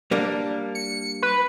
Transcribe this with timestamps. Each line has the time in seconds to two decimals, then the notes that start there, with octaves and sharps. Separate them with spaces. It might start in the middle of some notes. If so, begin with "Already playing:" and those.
0.11 G3 A#3 D4
0.75 C#7
1.22 B4